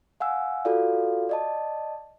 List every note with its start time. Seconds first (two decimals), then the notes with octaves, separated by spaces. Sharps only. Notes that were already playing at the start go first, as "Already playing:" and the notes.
0.20 F5 F#5 G#5 E6
0.65 F4 F#4 A4 D5 F5
1.29 D5 D#5 A5